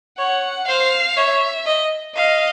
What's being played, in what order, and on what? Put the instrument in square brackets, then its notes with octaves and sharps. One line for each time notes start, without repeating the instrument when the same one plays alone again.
[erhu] C#5 [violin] F#5
[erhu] C5 [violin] F5
[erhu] C#5 [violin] E5
[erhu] D#5
[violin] D#5 [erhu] F5